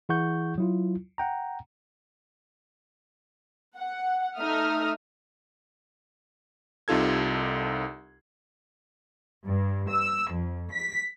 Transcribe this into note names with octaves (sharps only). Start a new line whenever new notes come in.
E3 E4 G#4 F#5 C#6 G6
F#3 E4 F4
F#5 G5 A#5
F#5
A3 D#4 E5 D#6 F6
C2 C3 D#4 F4 A4 G#6
G2
E6
F2
B6